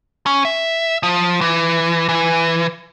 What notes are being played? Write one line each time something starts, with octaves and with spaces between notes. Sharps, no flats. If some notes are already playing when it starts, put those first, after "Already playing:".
C#4
E5
F3
E3
E3